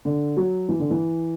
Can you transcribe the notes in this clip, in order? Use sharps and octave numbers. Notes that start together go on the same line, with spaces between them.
D3
F#3
E3
D3
E3